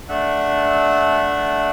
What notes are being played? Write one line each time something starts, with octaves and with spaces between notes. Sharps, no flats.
A3 D4 E5 F#5